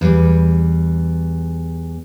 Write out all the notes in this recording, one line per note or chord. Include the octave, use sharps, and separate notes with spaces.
E2 G3